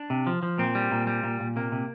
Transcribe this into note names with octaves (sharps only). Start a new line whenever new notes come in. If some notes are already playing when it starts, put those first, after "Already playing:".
Already playing: D4
C3
F3
F3
A#2 C4
G3
A#2
G3
A#2
A#2
C3 A#3
C3